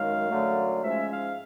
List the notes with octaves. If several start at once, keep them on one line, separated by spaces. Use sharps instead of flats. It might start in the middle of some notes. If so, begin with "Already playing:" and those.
Already playing: F#2 D#3 G#3 F5
F#2 D3 F#3 A3
G#2 F3 G#3 C#4 E5
F5